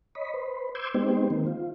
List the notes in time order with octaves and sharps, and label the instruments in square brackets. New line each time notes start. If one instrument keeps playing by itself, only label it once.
[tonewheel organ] C#5 D#5 B5
B4 C5
C6 D6 E6 G6 G#6
G#3 B3 C4 D#4 G4 C5
D#3 A#3 C4
F4